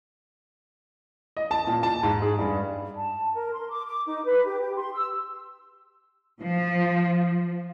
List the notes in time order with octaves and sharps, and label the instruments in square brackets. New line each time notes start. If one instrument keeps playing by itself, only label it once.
[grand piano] D#5
A5
A#2
A5
G#2
G#4
G2
[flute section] A5
A#4
C6
D6
D6
D#4
B4
G4
G4
C6
E6
[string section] F3